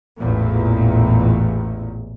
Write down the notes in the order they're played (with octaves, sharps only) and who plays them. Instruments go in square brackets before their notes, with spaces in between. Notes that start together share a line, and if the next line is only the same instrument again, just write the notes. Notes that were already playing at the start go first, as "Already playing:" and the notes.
[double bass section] A1 E2 A#2